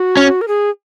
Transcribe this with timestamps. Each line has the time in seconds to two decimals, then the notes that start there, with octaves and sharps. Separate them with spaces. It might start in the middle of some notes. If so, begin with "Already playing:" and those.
Already playing: F#4
0.17 C#4
0.41 A#4
0.48 G#4